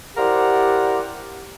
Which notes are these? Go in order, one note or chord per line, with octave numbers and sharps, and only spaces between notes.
E4 G4 A#4 C5 D5 F#5